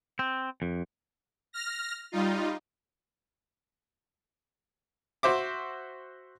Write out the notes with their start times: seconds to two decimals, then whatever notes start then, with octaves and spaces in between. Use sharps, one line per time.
0.19 C4
0.62 F2
1.53 F6 A#6
2.12 G3 D#4 F4
5.23 F#4 C5 E5 D6